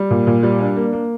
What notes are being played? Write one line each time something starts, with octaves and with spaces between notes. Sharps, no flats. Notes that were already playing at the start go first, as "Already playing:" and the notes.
Already playing: G3
A#2
A#2
G3
D4
A#3
A#3